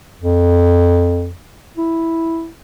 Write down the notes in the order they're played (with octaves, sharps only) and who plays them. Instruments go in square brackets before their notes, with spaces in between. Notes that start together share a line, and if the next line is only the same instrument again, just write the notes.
[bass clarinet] F2
E4